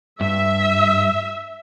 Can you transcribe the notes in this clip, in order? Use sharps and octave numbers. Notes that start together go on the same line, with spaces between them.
G2 E5